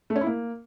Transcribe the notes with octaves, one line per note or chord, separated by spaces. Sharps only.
A3
C#4
E4
A#3